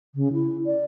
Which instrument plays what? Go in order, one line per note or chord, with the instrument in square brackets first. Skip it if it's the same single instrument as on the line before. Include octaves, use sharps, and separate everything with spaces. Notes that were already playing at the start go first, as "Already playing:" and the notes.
[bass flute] C#3
E4
D5